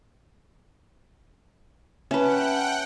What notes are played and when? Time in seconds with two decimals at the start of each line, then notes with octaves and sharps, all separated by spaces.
2.11 C#4 B4 E5 F#5 G5 A5 F#6